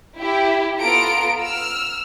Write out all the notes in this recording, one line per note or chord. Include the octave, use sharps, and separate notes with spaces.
E4 G4
B3 F4 A4 A#5 D7
E6 F6